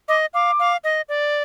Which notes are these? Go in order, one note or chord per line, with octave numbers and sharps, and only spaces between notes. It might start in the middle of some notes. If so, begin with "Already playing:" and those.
D#5 D6
F5 D6
F5
D#5
D5